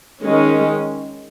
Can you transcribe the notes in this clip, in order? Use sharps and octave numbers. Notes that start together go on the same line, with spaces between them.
D#3 G#3 C#4